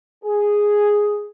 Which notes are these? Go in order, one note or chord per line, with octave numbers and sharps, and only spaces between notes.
G#4